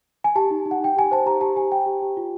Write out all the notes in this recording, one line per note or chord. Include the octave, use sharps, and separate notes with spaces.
G#5
G4 A5
D#4
D#4
F#5
D#4 G5
G4 G#5
C5 A5
G4 A#5
G4 A5
G4 G#5
G4 G5
G4
G4
F4